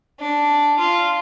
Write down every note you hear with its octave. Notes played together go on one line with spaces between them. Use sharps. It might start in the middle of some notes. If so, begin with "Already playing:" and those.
D4
F4